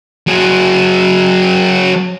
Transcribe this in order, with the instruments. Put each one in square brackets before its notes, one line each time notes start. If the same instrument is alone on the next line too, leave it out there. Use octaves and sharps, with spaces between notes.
[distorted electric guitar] F#3 G#4